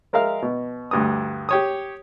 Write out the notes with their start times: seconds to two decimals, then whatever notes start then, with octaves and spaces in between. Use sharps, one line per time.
0.13 G#3 A#4 E5 F5 F6
0.42 B2
0.91 D2 G2 D#6
1.49 G4 C#5 D#6